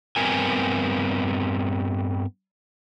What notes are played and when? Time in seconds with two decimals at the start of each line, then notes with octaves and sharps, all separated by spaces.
0.16 G2 B3 C4 A#4 G#5